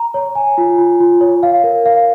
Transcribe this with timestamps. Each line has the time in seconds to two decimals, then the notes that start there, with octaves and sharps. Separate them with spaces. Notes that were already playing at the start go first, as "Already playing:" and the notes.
Already playing: A#5
0.14 C#5
0.35 G#5
0.58 F4
0.78 F4
1.00 F4
1.21 C#5
1.43 F5
1.64 A#4
1.86 F5